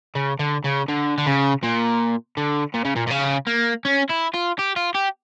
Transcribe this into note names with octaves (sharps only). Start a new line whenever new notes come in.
C#3
D3
C#3
D3
D3
C#3
A#2
D3
A#2
C#3
A#2
A#2
C#3
A#3
C#4
E4
F4
G4
F4
G4